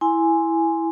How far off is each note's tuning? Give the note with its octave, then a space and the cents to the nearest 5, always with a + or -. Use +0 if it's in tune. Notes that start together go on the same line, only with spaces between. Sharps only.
E4 +0 G#5 +0 C6 +0